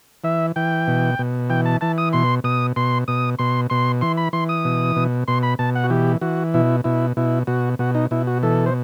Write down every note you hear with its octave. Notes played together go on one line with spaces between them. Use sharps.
E3 E5
E3 G5
B2
B2
E3 G5
A5
E3 A5
D#6
B2 C6
B2 D#6
B2 C6
B2 D#6
B2 C6
B2 C6
E3 C6
B5
E3 C6
D#6
B2
B2
B2 C6
B5
B2 A5
F#5
F#4
E3 G4
E3 F#4
B2 E4
B2 E4
B2 E4
B2 F#4
B2 F#4
D#4
B2 E4
F#4
E3 A4
C5